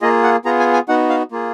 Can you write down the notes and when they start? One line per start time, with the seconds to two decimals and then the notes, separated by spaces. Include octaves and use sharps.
0.02 A#3 F4 G#4 D#5
0.24 F#5
0.45 B3 F4 G#4 A#5
0.60 G#5
0.73 G#5
0.88 B3 D#4 F#4 F#5
1.09 F5
1.31 A#3 F4 G#4